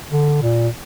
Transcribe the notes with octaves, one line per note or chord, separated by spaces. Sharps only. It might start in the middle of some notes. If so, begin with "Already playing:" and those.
D3
A#2